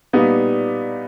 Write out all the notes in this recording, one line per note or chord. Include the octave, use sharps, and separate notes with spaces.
A#2 G3 B3 D#4